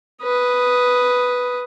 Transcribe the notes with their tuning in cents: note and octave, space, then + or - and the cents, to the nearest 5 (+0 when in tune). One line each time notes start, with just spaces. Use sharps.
B4 +0 D#6 +0